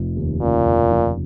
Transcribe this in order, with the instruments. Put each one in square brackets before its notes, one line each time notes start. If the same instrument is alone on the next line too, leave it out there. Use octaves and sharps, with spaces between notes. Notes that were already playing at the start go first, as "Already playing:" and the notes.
Already playing: [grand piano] F1 F3
D#2
[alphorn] A#2 [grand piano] C#3
[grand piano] F1
F3